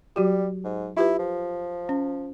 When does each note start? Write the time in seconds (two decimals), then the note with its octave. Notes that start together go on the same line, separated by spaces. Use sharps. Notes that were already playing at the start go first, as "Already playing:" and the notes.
0.16 F#3 G3 F#4 G4
0.64 G#2
0.97 E4 F4 G4 B4
1.19 F3
1.89 C#4